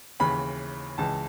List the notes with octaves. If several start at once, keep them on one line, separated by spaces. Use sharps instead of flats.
D#2 C#3 E3 B5
C#2 C#3 E3 A5